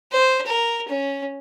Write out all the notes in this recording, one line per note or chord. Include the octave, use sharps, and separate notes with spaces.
C5
A#4
C#4